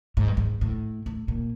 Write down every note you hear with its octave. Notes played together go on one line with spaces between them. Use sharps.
G#2
G2
G#2
A2
A2
A#2